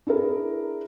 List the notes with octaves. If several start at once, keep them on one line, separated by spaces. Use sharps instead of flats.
D4 E4 G#4 A#4